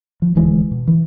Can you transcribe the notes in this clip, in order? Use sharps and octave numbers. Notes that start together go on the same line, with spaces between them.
F3
D#1 D2 E3 G#3
B2
E3